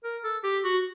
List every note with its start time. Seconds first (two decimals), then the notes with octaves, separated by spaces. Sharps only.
0.04 A#4
0.24 A4
0.44 G4
0.64 F#4